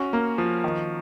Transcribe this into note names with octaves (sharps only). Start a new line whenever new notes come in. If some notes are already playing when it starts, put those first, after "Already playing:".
Already playing: C#4 F#4
A#3
F3
D#3